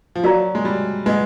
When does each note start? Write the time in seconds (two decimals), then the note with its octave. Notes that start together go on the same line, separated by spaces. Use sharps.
0.15 F3
0.24 F#3 F#4 A#4 D5 F5 A#5
0.55 G#3
0.65 G3
1.06 G#3 B4 D#5 F#5